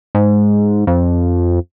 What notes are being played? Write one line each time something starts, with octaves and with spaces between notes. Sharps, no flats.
G#2
F2